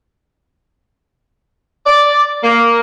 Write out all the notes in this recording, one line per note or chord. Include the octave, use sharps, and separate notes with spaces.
D5
A#3